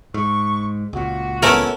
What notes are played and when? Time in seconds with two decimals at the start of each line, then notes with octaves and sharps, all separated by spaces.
0.14 G#2 C#6
0.93 C#2 A#2 F#4
1.42 A3 B3 C#4 E4 A#4